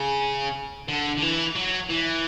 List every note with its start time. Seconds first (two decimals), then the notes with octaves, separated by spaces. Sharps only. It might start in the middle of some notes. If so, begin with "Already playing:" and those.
Already playing: C#3
0.88 D3
1.17 D3
1.22 E3
1.56 F#3
1.90 E3